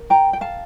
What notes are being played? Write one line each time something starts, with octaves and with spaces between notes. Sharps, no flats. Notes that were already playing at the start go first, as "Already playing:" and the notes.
Already playing: A#4
G5 A#5
G5
F5 A5